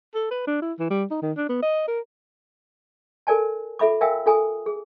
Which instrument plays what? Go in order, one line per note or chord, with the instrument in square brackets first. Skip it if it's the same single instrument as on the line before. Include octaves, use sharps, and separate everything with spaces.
[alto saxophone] A4
B4
D4
E4
E3
G3
D#4
D#3
D4
B3
D#5
A#4
[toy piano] A4 A#4 D5 G#5 A5
F4 A4 E5 B5 D6
A#4 E5 F5 G5 G#5 E6
F4 A4 G#5 A#5 D#6
G#4